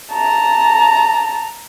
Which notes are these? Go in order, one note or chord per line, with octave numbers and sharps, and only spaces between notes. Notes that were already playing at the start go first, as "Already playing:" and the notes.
A5 A#5